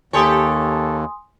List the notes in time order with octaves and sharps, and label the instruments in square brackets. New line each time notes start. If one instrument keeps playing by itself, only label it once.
[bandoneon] D#2 [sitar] G4 A4 C#5 [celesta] G#5 C6 D#6